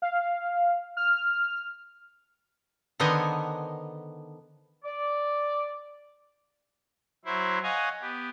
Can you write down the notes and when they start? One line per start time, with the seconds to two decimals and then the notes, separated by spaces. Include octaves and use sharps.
0.02 F5
0.97 F6
3.00 D3 D#3 B3 C5 D#5 G#5
4.85 D5
7.25 F#3 E4 C5
7.63 C#5 D#5 F5 F#5 G#5
8.02 B3 G4